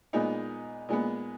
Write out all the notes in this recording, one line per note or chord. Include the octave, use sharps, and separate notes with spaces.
A#2 G#3 B3 D#4
A#2 G#3 B3